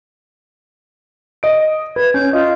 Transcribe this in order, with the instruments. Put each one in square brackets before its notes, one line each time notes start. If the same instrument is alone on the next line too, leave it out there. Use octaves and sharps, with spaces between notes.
[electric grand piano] D#5 D7
[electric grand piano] B4 [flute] G#6
[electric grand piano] C#4 [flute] G6
[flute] F4 [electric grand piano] D#5